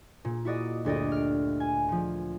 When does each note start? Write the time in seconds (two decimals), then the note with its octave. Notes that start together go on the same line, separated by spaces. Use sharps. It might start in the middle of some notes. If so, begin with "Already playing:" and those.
0.25 A#2
0.45 E4 F#4 D5 D#5
0.84 G1 D2 D5 D#5
1.12 F6 D7
1.60 G#5
1.88 A#2 F3